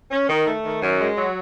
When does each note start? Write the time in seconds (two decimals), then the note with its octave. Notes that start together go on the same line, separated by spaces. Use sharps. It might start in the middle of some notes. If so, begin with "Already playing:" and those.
0.11 C#4
0.29 D#3
0.47 A3
0.65 D#3
0.83 F#2
1.00 G#3
1.17 F#3